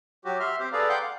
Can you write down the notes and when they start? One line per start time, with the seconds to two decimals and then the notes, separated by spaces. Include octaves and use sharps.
0.25 F#3 F#4 G4
0.40 E5 C6 F6
0.59 C4 G4 C5
0.73 G#4 A4 B4 D5 F5 A#5
0.89 F#5 G5 C6 D6 F#6 G6
1.03 F5